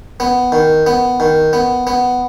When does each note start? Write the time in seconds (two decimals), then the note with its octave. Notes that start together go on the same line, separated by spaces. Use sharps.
0.20 B3
0.52 D#3
0.86 B3
1.20 D#3
1.53 B3
1.87 B3